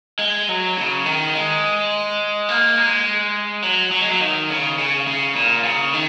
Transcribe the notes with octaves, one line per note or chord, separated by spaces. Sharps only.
G#3
F#3
C#3
D#3
G#3
A#3
G#3
F#3
F#3
G#3
F#3
D#3
C#3
C#3
C#3
A#2
C#3
D#3